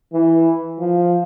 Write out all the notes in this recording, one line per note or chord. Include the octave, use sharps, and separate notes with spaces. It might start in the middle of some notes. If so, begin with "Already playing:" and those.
E3
F3